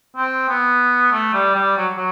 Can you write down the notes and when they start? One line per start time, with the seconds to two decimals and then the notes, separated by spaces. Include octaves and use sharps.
0.16 C4
0.49 B3
1.12 A3
1.34 G3
1.55 G3
1.77 F#3
1.97 F#3